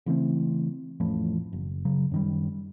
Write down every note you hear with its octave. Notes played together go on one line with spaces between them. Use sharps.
C#3 E3 A3 C4
A1 F2 A2
F#1
C#3 F#3
F#2 D#3 G3